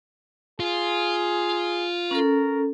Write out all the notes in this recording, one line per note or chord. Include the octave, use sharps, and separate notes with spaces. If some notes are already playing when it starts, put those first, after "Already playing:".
F4 G#4
C#4 A4 A#4